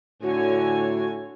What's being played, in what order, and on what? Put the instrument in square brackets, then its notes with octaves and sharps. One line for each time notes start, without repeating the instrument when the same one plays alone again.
[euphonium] A2 [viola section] D3 C#5 G#5 [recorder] F#4